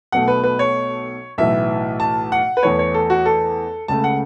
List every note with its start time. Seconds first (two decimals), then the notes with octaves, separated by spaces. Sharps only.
0.12 B1 B2 A3 F#5
0.28 B4
0.44 B4
0.59 C#5
1.38 B1 A2 E3 E5
2.00 A5
2.32 F#5
2.57 B4
2.63 E2 E3 A3 C#5
2.79 C#5
2.94 A4
3.10 F#4
3.26 A4
3.88 C#2 C#3 A3 A5
4.04 F#5